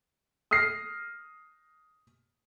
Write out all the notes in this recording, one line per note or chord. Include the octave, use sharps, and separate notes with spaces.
D#6 F6 A#6 C7